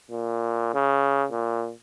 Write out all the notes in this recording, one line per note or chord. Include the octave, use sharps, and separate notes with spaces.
A#2
C#3
A#2